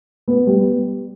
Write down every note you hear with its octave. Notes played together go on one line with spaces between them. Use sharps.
B3 B4
G3 G4